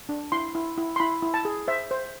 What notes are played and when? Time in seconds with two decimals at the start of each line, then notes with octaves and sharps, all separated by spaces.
0.09 D4
0.32 E4 C6
0.55 E4
0.77 E4
0.96 C6
1.00 E4 B5
1.22 E4
1.34 A5
1.45 G#4
1.68 C5 E5
1.91 C5